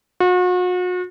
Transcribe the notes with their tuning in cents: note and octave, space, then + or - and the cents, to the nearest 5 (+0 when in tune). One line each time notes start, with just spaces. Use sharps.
F#4 -40